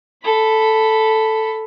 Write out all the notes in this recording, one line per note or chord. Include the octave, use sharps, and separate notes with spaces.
A4 B5